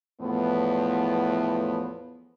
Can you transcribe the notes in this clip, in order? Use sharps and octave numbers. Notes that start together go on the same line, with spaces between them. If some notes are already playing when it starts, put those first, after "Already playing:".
E2 A2 F3 B3